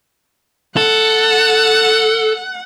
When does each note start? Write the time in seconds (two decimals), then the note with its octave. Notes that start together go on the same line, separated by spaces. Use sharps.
0.77 A4 F#5